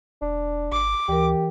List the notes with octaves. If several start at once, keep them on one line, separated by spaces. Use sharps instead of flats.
E1 D4
G#1 D6
D2 E3 G4 A#4